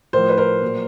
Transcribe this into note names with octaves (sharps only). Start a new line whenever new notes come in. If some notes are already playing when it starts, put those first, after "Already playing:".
A2 F3 A#4 C5
B4
A#4 C5
A#2 F#3